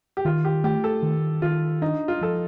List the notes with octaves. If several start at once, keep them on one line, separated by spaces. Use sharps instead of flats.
G4
D#3 F4
G4
A3 G4
A4
D#3
D#3 F4
D4 D#4
F4
F3 A4